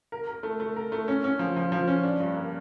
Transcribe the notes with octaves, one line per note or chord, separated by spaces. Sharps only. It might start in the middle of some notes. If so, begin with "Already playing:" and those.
A#4
A#4
A3
A3
A#4
A3
C#4
C#4
F3
F3
F3
C#4
D4
G2
A#3